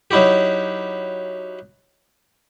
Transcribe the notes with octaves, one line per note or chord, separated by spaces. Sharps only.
F#3 D#4 E4 F#4 G4